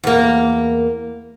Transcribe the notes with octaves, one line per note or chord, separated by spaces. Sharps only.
E2 A#3